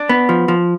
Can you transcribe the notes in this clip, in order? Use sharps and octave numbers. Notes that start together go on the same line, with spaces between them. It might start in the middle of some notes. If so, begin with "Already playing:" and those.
Already playing: D4
B3
F3
F3